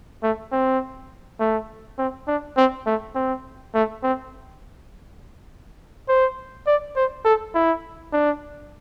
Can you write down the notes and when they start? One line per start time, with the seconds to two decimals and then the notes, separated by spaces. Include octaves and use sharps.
0.23 A3
0.52 C4
1.40 A3
1.98 C4
2.28 D4
2.57 C4
2.86 A3
3.15 C4
3.74 A3
4.03 C4
6.08 C5
6.67 D5
6.96 C5
7.25 A4
7.55 E4
8.13 D4